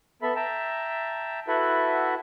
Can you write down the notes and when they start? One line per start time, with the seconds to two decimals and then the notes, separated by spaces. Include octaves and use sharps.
0.22 B3 A4 E5 B5
0.36 E5 G5 A5 A#5
1.48 E4 F#4 A4 B4 E5 F#5